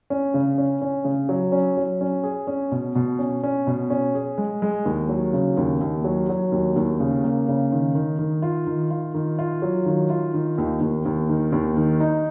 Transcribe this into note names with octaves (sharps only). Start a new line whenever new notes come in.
C#4
C#3
C#4
C#4
C#3
F#3
C#4
F#3
C#4
G#4
C#4
B2
B2
C#4
C#4
B2
C#4
G#4
G#3
G#3
D#2
F#3
C#3
D#2
D#2
F#3
F#3
D#2
D#2
C#3
A#3
C#3
D#3
D#3
D#3
F4
D#3
F4
D#3
F4
F#3
D#3
F4
D#3
D#2
D#2
D#2
D#3
D#2
D#3
D#4